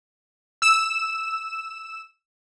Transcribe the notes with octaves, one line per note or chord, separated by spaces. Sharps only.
E6 E7